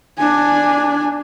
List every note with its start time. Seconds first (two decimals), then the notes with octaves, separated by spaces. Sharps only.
0.19 D4 G#5